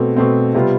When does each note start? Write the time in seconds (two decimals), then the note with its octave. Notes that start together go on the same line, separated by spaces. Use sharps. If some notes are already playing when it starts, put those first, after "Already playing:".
Already playing: B2 A3 C4
0.17 B2 A3 C4
0.54 C3 G3 B3 F4